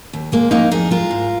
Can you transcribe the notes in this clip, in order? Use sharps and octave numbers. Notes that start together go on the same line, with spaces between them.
D#2
G#3 A#3
F2 A#3 D#4
F2 D#4 G#4
G#3 F4 A#4
G#2